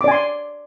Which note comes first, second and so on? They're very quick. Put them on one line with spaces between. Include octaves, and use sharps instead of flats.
D6 D5 G#5 C6